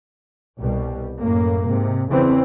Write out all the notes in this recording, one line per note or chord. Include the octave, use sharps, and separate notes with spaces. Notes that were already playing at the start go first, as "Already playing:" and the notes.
C2 B2 G3
F#2 A2 A#3
G#2 C3
E2 C#3 E3 C4